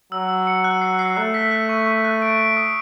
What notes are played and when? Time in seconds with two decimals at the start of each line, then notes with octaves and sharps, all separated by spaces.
0.12 F#3 E6
0.29 E6
0.47 C#7
0.64 F#6
0.82 C7
0.99 C7
1.17 A3 F#6
1.34 B6
1.51 F#6
1.69 C#6
1.86 C#6
2.05 F#6
2.22 D7
2.39 D7
2.57 D#6